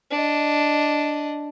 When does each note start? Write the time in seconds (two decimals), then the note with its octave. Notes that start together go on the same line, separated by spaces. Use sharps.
0.11 D4 D#5